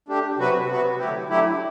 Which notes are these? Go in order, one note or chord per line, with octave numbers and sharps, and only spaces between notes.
A3 D4 G4
C3 F#3 B3 F#4 B4
C3 F#3 B3 F#4 B4
D3 F#3 A3 E4 G4
D3 F#3 A3 E4 G4